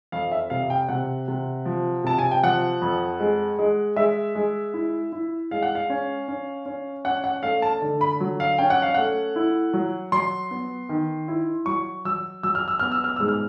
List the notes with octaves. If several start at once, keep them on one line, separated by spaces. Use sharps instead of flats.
F2 F5
E5
C3 F5
G5
C3 F#5
C3
F3
C3 A5
G#5
G5
F3 F#5
F2
G#3
G#3
G#3 E5
G#3
E4
E4
G#3 F5
F#5
F5
C#4
C#4
C#4
C#4 F#5
F#5
A3 F5
A5
D3
B5
F#3
F5
C#4 G5
F#5
F5
A3 F#5
E4
F#3
F#3 C6
B3
D#3
E4
F#3 C#6
F#3 E6
F#3 E6
F6
E6
B3 F6
E6
F6
G#2 E6
F6